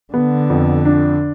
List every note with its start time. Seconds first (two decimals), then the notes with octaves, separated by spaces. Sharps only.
0.13 D3 B3
0.50 F2
0.85 D4